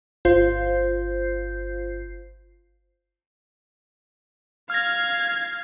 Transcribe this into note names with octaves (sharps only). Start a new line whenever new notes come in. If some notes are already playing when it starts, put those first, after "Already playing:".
G1 F4 C5 G6 C7
F5 F6 G#6 A#6